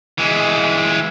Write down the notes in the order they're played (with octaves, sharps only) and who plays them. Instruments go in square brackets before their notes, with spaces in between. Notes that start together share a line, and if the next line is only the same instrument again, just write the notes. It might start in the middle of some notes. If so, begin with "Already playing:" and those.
[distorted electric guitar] E3 G#3